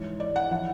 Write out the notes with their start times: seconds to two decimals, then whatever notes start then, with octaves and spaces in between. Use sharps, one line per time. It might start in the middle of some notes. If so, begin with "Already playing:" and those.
Already playing: G#2 E3 C#5
0.20 D5
0.36 F#5
0.51 E3 F#5